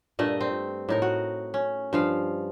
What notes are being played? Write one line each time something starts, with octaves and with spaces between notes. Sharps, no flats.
G2 A#2 A3 D#5
C4
A2 D#4 A#4
F#4
C#4
G2 F3 F5